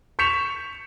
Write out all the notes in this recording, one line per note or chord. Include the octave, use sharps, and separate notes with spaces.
C#6 G6 B6 C#7 E7 F7